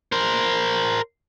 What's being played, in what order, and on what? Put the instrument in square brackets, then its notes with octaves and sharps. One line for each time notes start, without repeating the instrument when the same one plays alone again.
[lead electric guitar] A#4 C5